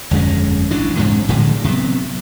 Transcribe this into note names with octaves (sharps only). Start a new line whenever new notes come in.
G1 F2 G#3 C#4
A1 E3 F#3 D4
G#2 C3 G#3
A2 D3 F3 G#3
C3 F#3 B3